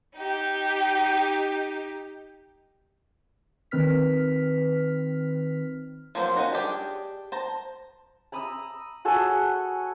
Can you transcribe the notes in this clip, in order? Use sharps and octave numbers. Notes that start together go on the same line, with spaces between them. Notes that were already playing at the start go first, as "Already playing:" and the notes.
D#4 G4
D#3 C4 B4 F6 B6
F3 F#3 A#3 C4 C5
C#4 D#4 F#4 A#4
D4 G4 G#4
C5 A5 A#5
A#5 B5 D#6 E6
F#4 G#4 A4 C#5